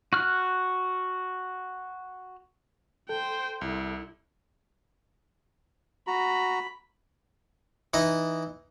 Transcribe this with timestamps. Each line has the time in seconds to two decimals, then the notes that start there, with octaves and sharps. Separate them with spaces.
0.13 F#4 F6 F#6
3.09 A4 C5 G5
3.61 C2 E4
6.07 F#4 A#5 B5
7.94 E3 D#4 D#5